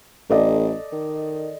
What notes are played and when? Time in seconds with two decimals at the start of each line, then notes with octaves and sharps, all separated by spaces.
0.30 A1 A4 D5 D#5
0.92 D#3